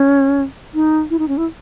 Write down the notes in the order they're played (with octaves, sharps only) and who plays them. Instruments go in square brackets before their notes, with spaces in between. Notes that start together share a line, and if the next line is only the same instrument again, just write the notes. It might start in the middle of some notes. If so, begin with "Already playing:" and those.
Already playing: [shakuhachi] C#4
D#4
E4
D#4
C#4
E4